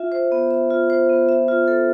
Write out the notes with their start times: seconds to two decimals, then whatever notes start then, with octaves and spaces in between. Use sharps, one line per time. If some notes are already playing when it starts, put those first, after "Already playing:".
Already playing: F4 E5
0.12 C5
0.32 B3
0.51 E5
0.70 F4
0.90 C5
1.09 B3
1.29 E5
1.48 F4
1.68 A4